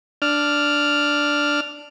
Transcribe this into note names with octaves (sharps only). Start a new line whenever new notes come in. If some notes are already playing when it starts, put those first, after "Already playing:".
D4 F6